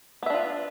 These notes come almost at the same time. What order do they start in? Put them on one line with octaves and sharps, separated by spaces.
B3 E5 D4 F4